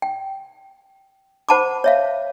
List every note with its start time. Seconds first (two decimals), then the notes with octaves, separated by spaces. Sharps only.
0.02 G5
1.49 C5 F#5 A5 B5 D6
1.84 C#5 E5 F5